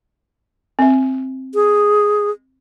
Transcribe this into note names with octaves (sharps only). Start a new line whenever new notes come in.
C4 E5
G#4